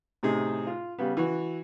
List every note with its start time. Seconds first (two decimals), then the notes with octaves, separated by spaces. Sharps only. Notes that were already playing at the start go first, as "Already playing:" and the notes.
0.23 A2 C3 D#4 G#4
0.67 F4
0.98 C#3 G3 B3
1.17 E3 F#4